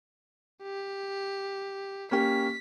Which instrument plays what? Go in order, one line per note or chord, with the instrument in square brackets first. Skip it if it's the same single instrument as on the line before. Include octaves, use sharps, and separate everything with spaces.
[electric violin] G4
[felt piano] A#3 C#4 G4 [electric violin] B6